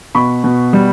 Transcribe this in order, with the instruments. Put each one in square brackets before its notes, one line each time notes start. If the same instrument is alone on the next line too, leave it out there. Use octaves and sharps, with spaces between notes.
[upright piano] B2 B5 C#6
B2
G3